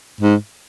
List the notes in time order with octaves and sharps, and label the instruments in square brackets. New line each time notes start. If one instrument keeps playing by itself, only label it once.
[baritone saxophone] G#2